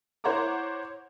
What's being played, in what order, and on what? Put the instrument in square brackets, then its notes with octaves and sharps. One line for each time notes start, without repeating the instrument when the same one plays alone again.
[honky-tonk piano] E4 C5 C#5 F#5 A#5 D6